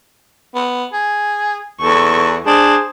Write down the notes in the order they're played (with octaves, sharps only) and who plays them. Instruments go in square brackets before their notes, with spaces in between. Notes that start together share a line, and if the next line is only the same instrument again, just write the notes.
[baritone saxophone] B3
G#4
[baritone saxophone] E2 [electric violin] A4 C#6
[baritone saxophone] D4 [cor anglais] G#4 [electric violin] C5